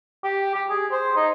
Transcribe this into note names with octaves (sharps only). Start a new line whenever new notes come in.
G4
G4
G#4
C5
D#4